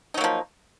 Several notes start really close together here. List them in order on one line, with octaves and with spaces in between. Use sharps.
D#4 F#3 A#3 F3